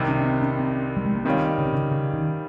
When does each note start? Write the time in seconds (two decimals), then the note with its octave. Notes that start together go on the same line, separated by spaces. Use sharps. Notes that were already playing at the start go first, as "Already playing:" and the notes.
Already playing: C2 C3 D#3
0.08 C#4
0.21 C#4
0.25 C4
0.42 C#4
0.60 C4
0.97 G3
1.06 G#3
1.15 A#3
1.25 D#3 G3 C4 C#4 F4
1.58 C#3
1.66 C3
1.74 C#3
1.92 C#3
2.14 D#3